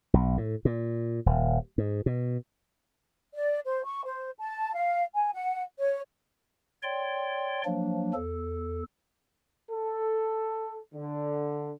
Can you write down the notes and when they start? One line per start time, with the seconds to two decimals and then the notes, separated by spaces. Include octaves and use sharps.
0.14 B1
0.38 A2
0.65 A#2
1.26 D#1
1.78 G#2
2.06 B2
3.33 D5
3.65 C5
3.84 C#6
4.05 C5
4.38 A5
4.75 F5
5.14 G#5
5.34 F#5
5.78 C#5
6.83 C#5 D5 G5 C6
7.65 F3 F#3 A#3 D4
8.14 E2 A4
9.70 A4
10.94 D3